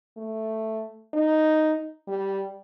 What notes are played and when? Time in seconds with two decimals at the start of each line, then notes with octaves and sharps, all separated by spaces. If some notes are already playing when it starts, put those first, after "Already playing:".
0.17 A3
1.14 D#4
2.08 G3